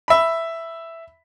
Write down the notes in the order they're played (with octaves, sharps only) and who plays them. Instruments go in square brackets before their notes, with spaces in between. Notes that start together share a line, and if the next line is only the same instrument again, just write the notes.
[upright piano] E5 B5